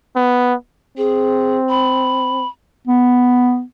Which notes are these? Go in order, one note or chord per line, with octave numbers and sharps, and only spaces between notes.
B3
C4 G#4
B5
B3